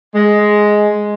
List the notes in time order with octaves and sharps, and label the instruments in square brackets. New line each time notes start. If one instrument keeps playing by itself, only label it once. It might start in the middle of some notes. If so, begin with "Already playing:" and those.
[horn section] G#3